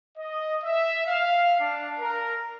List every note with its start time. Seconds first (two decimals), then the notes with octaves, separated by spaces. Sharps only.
0.17 D#5
0.64 E5
1.07 F5
1.60 D4
1.99 A#4